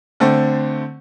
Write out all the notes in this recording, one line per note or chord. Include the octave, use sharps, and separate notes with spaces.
D3 A3 C4